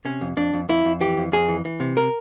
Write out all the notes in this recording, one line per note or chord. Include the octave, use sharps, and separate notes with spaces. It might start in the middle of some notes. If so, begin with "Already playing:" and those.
C3 C#4
F2
F2 D4
F2
F2 E4
F2
E3 G4
F2
F2 G#4
E3
E3
C3
A#4